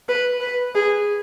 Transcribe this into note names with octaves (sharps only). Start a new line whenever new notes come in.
B4
B4
G#4